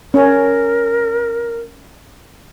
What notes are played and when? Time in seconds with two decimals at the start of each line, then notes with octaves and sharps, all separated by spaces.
0.14 C#4 A#4